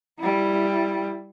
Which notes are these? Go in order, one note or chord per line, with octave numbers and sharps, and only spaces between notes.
G3 E4